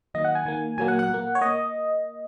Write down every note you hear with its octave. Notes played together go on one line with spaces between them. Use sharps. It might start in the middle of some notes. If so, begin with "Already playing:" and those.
D#3 F#3 A#3 D#5
F#5
G#5
D#3 A#3 G#5
A#2 F#3 A#3 G#5
F#5
F#5
A#2 A#3
C#5
A#3 D#5